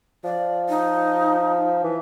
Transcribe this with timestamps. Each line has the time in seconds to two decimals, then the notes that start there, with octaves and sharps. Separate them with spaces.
0.24 F3 D5
0.69 D#4
1.83 E3